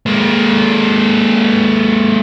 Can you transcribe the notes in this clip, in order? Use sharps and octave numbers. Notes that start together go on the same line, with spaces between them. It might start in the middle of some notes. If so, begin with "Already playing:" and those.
G#3 A#3